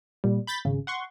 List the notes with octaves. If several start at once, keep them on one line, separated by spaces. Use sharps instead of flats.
A#2 G3
B5 G6 A6 B6
G#1 C#3
F#5 C6 C#6